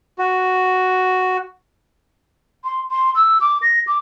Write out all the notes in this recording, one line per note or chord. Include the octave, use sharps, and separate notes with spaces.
F#4
C6
C6
E6
D6
A#6
D6